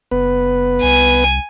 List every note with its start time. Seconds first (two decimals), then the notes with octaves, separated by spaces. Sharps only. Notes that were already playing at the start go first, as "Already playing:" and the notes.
0.11 F#1 B3 B4
0.83 C2 G#5